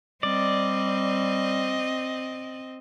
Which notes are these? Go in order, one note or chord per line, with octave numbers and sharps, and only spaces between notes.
G3 C4 D5 D#5